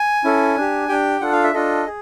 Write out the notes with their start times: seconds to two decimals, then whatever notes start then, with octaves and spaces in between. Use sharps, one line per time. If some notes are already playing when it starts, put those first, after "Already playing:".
Already playing: G#5
0.24 C#4 E4 A4
0.57 D4 G4
0.88 D4 G4 G5
1.21 D4 F4 A4 F#5
1.32 F5
1.44 E5
1.54 D4 F4 A4 D#5
1.86 G#4